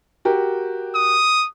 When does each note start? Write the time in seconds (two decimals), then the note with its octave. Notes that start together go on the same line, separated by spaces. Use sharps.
0.25 F#4 G4 A#4
0.95 D#6